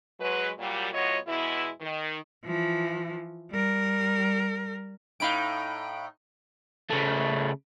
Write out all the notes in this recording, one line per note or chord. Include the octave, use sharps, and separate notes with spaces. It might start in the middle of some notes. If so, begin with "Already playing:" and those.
F#3 G#3 B4
A#2 F#3 G3
A2 F#3 B3 F4 C#5 D#5
E2 B2 G#3 E4
D#3
E3 F3
G3 A#4
A2 D#4 F5 B5 D7
C#3 A3